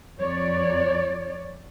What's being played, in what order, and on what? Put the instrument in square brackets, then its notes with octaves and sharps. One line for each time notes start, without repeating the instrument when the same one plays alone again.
[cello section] F2 C#5 D5